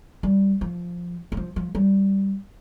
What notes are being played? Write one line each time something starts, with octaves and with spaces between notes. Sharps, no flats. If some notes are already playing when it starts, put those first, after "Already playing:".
G3
F3
G3
F3
F3
G3